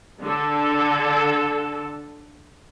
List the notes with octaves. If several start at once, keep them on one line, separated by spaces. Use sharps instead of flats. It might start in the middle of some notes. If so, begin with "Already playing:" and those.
D3 A4